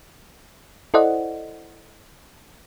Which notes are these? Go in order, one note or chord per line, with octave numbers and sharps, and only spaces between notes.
E4 A4 C5 D5 D#5 F#5